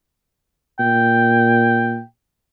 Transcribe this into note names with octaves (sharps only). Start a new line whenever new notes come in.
A#2 G5